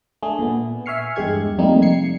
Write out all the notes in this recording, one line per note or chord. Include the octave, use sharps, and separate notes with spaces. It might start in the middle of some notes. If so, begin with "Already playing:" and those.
A3 D4 G#4
A#2 B3
E5 G#5 C#6 F6 C7 C#7
E2 G2 G#3 G4 G#6 C#7
F2 C3 G3 A3 A#3 D#4
G#6 C7 C#7